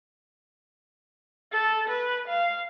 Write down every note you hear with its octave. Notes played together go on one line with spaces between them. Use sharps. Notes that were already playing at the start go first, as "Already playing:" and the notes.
A4
B4
F5